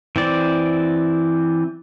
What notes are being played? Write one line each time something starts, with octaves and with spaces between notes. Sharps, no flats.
E3 C4 D5